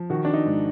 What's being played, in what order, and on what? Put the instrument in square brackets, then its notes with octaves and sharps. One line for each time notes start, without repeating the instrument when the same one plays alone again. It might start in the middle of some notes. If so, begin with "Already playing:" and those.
Already playing: [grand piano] F3
D#3 F#4
D4
D#4
G#2